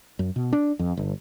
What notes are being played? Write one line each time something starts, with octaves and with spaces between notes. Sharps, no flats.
F#2
B2
D4
F2
G1